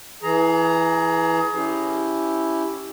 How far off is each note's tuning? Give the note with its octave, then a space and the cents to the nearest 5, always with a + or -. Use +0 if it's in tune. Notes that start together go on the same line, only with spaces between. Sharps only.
E3 +0 G#4 +25 A#5 +0
C#4 +15 E4 +0 G4 +0